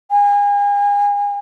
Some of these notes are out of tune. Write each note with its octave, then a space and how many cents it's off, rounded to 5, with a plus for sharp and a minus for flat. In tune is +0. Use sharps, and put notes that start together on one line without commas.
G#5 -35